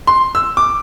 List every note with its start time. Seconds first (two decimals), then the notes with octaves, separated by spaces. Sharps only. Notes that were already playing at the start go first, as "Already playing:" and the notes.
0.07 C6
0.35 E6
0.57 D6